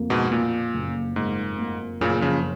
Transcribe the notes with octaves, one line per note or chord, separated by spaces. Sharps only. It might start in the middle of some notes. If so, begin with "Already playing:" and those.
Already playing: F2 A#3
G#2 B2
A#2 A#3
F#1
G#2 A#3
A#3
F#1 A#2 C#3
C#3 F3